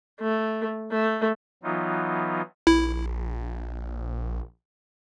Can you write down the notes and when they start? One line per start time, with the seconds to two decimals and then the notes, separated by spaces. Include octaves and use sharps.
0.20 A3
0.91 A3
1.63 E3 F#3 B3 D#4 F4
2.67 A#1 E4